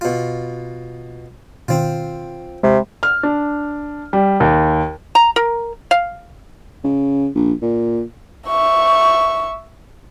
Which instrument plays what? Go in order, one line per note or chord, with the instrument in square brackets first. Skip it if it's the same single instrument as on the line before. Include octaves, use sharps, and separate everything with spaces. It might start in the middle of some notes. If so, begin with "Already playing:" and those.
[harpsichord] B2 F4
[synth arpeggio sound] B2 D#3 [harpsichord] C4 F4
[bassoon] C3 [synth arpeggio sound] G#3 B5
[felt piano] F6
D4
G3
D#2
[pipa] A#5
A#4
F5
[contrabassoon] C#3
A#1
A#2
[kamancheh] E5 C#6